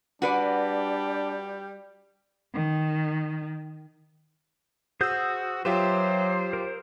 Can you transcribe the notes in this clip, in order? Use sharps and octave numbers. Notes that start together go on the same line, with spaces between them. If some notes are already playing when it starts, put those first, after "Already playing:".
G3 D4 F#4 B4 D5
D#3
F#4 G#4 C5 D#6 E6 G6
F#3 F4 G4 B4 C5 E5 G5 E7
A#4